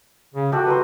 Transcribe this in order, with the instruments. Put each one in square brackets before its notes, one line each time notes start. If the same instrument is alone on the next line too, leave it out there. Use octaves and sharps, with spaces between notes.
[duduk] C#3
[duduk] F#4 [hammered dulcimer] G4 A4
[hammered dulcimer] B4 A#5 C6